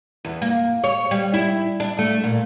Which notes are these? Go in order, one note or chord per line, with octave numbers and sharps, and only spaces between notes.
E2
A#3
C#5
G3
E4
D4
A3
A#2